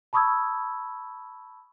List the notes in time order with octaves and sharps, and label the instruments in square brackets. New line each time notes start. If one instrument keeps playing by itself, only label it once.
[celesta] A5 B5 C#6 D#6 E6 G#6